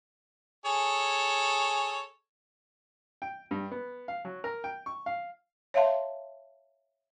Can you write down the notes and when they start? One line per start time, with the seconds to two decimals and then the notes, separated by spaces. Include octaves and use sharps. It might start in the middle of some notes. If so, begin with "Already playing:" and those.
0.65 G#4 A4 C#5
3.22 G5
3.51 G2
3.72 B3
4.08 F5
4.25 F#3
4.44 A#4
4.64 G5
4.86 C#6
5.06 F5
5.74 C#5 E5 F5 A5 C6